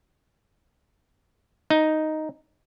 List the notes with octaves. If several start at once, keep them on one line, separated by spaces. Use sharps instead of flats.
D#4